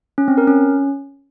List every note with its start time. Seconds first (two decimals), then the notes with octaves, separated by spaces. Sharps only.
0.18 C#4
0.28 C4
0.38 A#4
0.47 C#4